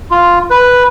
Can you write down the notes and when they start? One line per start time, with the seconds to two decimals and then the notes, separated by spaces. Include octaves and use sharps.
0.11 F4
0.50 B4